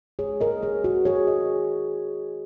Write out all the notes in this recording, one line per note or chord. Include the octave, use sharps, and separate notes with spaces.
G#3 G#4 C#5
A#4 D#5
G#3 G#4 C#5
F#4 A#4
D#3 G#4 C#5
D#5